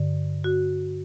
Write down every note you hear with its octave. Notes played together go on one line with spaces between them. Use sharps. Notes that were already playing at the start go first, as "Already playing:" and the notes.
Already playing: G2 D3
F#4